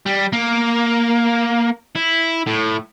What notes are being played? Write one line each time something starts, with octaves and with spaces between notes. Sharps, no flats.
G3
A#3
E4
A2